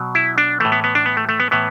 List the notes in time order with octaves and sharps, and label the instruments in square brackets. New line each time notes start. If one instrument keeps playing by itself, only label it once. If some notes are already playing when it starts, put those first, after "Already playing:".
Already playing: [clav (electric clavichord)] B2 F#3
E4
D4
A2 E3 A3
B3
B3
D4
B3
A3
A3
B3
A2 E3 B3